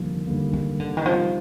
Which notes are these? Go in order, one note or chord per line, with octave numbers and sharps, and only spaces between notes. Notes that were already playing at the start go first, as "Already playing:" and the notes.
Already playing: F1 D#2 D3 F3 G3 A#3
F1 D#2 D3 G3 A#3
D#3
D3
D#3
C3 F3 G3 C4 D#4